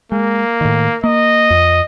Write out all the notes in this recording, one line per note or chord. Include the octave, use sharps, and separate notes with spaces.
G#3 A#3
A2 D#3
A#3 D#5
F2